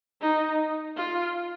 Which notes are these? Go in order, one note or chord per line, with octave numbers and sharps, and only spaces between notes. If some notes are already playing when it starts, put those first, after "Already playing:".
D#4
F4